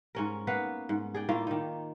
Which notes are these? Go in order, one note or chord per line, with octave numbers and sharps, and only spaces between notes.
G#2 C#4 A#4
A#3 B3 B4 F5
G#2
G#4 D5 G5
A2 A#3 F4 F5
D#3 D#4